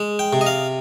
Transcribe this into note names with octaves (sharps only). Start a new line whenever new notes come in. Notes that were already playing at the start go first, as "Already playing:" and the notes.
Already playing: G#3
G5
C3
D#5
F5